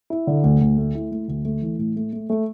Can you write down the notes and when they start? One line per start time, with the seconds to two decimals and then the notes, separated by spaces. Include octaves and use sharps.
0.10 E4
0.27 D3
0.44 D2
0.61 D2
0.78 A3
0.95 E4
1.11 A3
1.28 D2
1.45 A3
1.62 E3
1.79 A2
1.96 A3
2.13 A3
2.30 A3